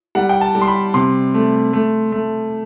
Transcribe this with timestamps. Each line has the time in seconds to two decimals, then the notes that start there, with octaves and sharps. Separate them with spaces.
0.15 G3 F#5
0.29 G5
0.41 A5
0.55 G3
0.62 C6
0.68 B5
0.94 C3 C6
1.34 A3
1.73 A3
2.12 A3